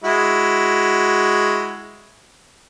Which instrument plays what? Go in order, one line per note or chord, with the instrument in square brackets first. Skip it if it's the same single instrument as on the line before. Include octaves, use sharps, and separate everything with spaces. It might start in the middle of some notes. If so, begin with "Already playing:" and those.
[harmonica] G#3 E4 F#4